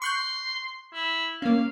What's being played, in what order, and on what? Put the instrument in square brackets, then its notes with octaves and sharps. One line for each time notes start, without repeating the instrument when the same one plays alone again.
[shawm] C6 [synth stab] C#6 F#6 G6
[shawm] E4
[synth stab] A#3 C#4 [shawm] F5